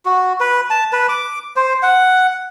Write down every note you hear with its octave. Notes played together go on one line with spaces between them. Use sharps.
F#4
B4
A5
B4
D6
C5
F#5